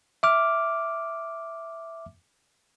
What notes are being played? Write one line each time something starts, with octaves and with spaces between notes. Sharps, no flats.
E5 D6 F6